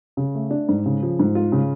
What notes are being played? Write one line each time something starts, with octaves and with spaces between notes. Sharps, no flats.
C#3
A3
D4
G#2
C#3
F3
G#2
F4
C#3